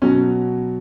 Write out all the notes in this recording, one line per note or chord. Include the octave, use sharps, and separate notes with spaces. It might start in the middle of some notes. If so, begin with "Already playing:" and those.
B2 F#3 C#4